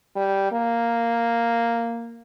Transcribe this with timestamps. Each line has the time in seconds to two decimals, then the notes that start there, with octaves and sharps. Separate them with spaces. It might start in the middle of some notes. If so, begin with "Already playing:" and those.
0.16 G3
0.52 A#3